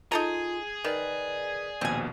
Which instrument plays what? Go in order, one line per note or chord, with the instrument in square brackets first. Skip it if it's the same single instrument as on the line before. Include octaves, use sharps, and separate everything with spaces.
[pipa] D#4 A4 A#5 [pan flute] F4 [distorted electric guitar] G#4
[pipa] D#3 [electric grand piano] A#4 B4 [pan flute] D5
[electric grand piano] A#1 D#2 B2 [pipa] C4 G#5